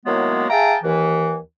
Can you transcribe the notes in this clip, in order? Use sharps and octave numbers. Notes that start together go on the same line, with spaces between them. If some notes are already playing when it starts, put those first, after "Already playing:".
A2 D#3 F#3 G#3 A#3 B3
G#4 E5 F5 G5 A5 A#5
D#2 E3